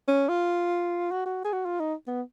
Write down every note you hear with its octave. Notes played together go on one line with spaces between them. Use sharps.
C#4
F4
F#4
F#4
G#4
F#4
F4
D#4
B3